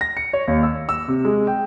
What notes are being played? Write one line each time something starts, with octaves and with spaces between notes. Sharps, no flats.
A#6
C#7
C#5
D#2
E6
E6
C3
G#3
G5